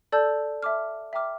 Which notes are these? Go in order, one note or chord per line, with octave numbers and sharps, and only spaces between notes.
A4 D5 A5 E6 G6
E5 A5 D6 F6
E5 G5 A#5 D6 F6